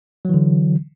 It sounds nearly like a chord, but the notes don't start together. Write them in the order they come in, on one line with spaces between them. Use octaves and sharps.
F#3 E3 D3